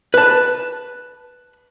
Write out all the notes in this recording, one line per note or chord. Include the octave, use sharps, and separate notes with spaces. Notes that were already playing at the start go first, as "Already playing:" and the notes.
B4 A5